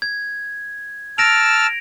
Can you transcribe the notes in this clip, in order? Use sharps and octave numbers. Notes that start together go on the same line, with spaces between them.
G#6
A5 E6 F6 A#6 D7 F7